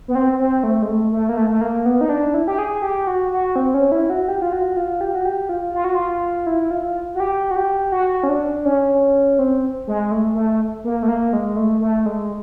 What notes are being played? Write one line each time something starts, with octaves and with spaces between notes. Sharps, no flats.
B3
C4
C4
A3
G#3
A3
A3
A#3
A3
A3
A#3
B3
D#4
D4
E4
G4
G#4
G4
F#4
F#4
C4
C#4
E4
F#4
G4
F4
F#4
F4
G4
F#4
G4
F4
F4
F#4
F4
E4
F4
F#4
G4
F#4
G4
F#4
C#4
D4
C#4
C4
G#3
A3
A3
A#3
A3
A#3
G#3
A3
A3
G#3